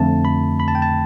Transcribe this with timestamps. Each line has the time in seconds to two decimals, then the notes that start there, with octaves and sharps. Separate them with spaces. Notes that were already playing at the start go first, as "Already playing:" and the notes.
Already playing: F2 D3 A3 A5
0.25 B5
0.60 B5
0.68 A5
0.75 G5
0.82 A5